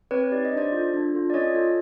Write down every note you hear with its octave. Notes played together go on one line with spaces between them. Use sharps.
C4 B4 C#5
D#4 G4 D5
D#5
D4 C5 D5
F4 A4
D4
F4 A4
D5
C#4 C#5 D#5
F4 A4